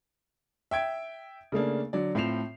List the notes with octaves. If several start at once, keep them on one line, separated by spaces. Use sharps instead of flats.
E5 G5 G#6 D7
C#3 A3 A#3 D4
D3 F#3 D5
A2 C4 F4 C7 E7 F7